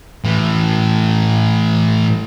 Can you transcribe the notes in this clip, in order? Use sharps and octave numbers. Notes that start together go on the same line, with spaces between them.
A2 E3